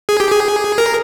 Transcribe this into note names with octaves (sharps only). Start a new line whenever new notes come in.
G#4
G4
G#4
A#4